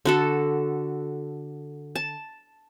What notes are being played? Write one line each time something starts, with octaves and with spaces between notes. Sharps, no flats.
D3 F#4 A4
A5